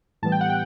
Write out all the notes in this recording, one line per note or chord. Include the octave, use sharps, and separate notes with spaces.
A2 E3 G3 B3 A5
G5
F#5
G5